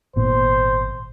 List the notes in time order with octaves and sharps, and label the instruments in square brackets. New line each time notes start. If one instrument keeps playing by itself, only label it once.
[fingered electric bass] G#1 A#2 B3 [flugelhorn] C5